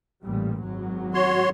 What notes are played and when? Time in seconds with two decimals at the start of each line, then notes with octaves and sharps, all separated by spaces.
0.23 A1 A#2 G3
0.62 G#1 F#2 F#3
1.14 F#4 C#5 C6